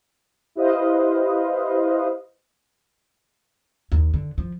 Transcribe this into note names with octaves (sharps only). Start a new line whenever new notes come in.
E4 G4 B4 C5 D#5 F5
D#2
D3
F3